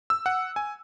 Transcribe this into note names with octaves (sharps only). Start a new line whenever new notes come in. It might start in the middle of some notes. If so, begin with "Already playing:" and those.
E6
F#5
G#5